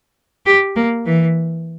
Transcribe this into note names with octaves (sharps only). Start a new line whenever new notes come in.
G4
A#3
E3